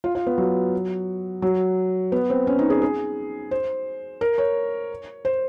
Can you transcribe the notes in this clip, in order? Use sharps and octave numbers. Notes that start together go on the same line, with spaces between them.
F4
F4
B3
F#3
F#3
B3
C4
C#4
D#4
G#4
G#4
C5
A#4
C#5
C5